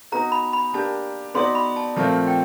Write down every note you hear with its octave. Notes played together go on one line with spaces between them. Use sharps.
B3 D#4 F#4 B4 A#5
B5
B5
A#3 D4 G4 A5
B3 D#4 F#4 B4 D5 C6
B5
A5
A#2 F3 A3 C4 F4 A5
G5